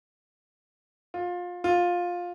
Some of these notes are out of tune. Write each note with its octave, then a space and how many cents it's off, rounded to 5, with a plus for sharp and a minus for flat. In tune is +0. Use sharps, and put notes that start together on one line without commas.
F4 +25
F4 +15